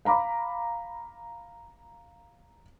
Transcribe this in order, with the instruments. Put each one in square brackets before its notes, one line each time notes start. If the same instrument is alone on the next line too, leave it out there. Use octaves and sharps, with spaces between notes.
[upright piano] F5 A#5 B5 D6